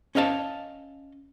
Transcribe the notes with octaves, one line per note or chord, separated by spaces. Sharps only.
C#4 D#5 F5 A5